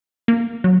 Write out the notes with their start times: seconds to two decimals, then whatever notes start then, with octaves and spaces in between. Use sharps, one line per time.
0.28 A#3
0.64 F#3